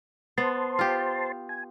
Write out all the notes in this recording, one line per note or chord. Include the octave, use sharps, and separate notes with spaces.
B3 C5 A5 C6
F4 G4
G#5